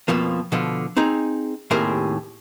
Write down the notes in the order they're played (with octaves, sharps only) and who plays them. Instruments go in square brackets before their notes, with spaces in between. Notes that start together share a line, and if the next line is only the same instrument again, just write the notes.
[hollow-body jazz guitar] F2 B2 F3 A#3
B2 D3 F3
C4 D#4 G#4 A#5
D#2 A2 C3 G#4 A#4 C5